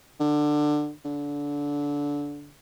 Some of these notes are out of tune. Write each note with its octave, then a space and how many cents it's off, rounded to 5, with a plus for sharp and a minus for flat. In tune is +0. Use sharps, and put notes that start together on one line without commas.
D3 +20
D3 -20